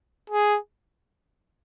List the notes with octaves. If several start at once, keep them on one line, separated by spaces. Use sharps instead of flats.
G#4